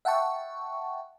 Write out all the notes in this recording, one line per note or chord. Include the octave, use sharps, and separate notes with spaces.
E5 F#5 G5 A5 C#6